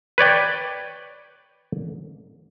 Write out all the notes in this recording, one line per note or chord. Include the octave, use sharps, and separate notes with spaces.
B4 C#5 D5 G5